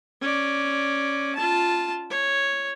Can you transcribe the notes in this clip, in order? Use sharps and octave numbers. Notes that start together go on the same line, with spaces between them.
C#4 D5
F4 A5
C#5